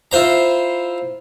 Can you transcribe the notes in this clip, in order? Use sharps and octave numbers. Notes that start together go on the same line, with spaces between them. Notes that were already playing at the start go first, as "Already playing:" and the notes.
E4 F4 C5 A#5